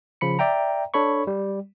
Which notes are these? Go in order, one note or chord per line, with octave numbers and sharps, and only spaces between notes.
C#3 F3 B5 C#7
D5 E5 G5 A#5
D4 A4 C#5 B5 C#6
G3